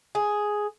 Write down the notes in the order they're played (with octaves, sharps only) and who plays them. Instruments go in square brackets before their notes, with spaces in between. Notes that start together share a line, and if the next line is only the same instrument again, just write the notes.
[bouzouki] G#4